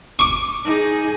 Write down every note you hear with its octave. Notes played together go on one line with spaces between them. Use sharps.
C#6 D6
D#4 G#4